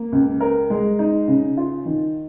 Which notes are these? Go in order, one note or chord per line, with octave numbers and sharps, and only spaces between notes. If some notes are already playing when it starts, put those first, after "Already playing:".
Already playing: A#3
C#2
A#4
G#3
D#4
C#3
F4
D#3